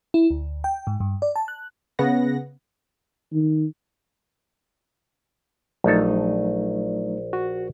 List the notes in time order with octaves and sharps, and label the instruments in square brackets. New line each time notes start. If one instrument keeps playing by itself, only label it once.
[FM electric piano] E4
D2
G5
G#2
G2
D5
A5
F#6
[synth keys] C#3 B3 F#5 A#6
[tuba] D#3
[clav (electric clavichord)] A#1 A4 [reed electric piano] F#3 A3 D#4
[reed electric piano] F#4